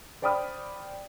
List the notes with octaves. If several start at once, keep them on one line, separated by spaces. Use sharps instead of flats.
C5 D5 G5 B5 D#6 F6